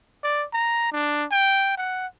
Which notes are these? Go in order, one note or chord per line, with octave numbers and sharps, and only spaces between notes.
D5
A#5
D4
G5
F#5